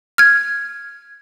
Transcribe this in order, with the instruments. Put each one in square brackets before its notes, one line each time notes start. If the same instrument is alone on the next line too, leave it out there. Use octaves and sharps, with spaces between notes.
[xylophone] F6 G#6